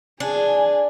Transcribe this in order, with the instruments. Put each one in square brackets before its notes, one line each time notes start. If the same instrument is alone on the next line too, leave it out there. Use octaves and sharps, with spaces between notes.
[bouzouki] D4 [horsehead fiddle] G#4 G#5